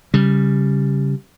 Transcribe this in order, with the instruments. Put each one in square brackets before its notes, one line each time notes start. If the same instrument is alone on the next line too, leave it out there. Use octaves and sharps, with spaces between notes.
[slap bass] C#3 G3